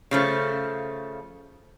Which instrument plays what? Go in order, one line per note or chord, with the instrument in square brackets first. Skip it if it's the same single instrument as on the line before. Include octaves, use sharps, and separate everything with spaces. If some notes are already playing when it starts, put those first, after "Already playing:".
[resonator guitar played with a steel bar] C#3 F3 A3